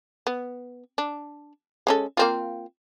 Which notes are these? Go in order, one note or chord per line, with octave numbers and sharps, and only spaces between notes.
B3
D4
G#3 C#4 A4
A#3 C4 F4